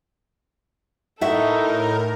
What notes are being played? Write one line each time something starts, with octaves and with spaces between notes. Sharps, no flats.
A2 D#4 E4 F#4 A4 A#4 E5